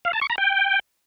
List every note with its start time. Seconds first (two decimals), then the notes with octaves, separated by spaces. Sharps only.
0.05 F5
0.13 A5
0.21 C#6
0.30 A#5
0.38 G5